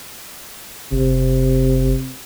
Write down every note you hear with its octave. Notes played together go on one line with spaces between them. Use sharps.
F#1 C3